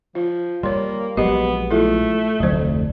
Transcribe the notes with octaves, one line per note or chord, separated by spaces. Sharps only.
F3 F4
G3 A#3 C#5 C6
A#1 F#3 G#3 B3 G4 D#5
A3 E4 F4 A4
F1 D2 F#3 D4 C5